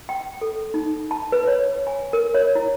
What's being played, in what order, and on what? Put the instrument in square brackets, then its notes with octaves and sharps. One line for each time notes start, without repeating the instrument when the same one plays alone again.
[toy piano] G5
A4
D#4
A5
B4
C#5
G#5
A#4
C#5
E4